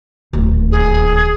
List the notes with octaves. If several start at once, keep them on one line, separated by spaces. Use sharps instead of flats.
D1 D#2
G#4